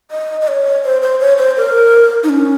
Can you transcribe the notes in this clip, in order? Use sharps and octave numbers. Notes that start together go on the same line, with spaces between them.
D#5
D#5
C#5
C5
C5
C#5
C5
A#4
D#4
C#4